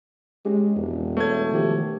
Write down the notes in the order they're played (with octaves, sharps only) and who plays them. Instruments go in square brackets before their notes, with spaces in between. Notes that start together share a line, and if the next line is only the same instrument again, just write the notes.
[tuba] G#3 [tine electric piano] C#4 G4
[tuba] E1 [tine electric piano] F2
[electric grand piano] A3 G#6 [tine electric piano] B4 C#5
[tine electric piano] D#3 F3 G4